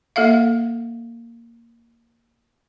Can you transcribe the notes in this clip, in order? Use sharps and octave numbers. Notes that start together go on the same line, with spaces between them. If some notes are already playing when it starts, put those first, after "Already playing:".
A#3 A4 E5 F5